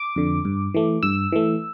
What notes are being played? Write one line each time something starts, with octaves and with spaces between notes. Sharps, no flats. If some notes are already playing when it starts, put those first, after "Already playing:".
Already playing: D6
F2 D3
G2
E3 A3
G2 E6
E3 A3